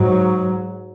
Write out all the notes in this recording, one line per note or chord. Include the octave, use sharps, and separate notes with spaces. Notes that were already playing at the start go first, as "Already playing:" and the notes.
Already playing: G#2 F#3